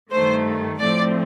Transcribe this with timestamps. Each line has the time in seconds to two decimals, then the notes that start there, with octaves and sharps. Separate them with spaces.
0.11 G2 D#3 A3 C5
0.79 A2 F3 A3 C4 D5